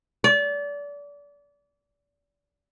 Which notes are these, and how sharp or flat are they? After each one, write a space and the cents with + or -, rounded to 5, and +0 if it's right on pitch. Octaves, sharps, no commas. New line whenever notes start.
D5 -30